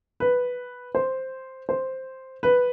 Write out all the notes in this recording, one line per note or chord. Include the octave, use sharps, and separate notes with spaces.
B4
C5
C5
B4